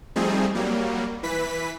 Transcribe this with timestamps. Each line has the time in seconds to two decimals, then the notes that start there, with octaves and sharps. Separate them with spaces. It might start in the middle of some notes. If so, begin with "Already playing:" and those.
0.16 F3 G3 A3 C4 D#4 G#4
0.55 F#3 G3 A#3
1.23 E3 B4 B6